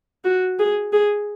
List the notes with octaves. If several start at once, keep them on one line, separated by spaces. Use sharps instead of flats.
F#4
G#4
G#4